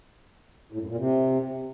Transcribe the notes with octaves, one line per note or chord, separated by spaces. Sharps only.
A2
F#2
A#2
C3